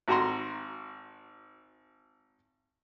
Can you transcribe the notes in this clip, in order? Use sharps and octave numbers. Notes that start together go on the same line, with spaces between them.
G#1 F#4 A#5 C6